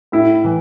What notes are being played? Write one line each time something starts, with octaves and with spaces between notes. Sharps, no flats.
A2 E4
E3